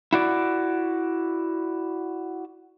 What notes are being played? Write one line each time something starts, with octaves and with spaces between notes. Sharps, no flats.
E4 F#4 D5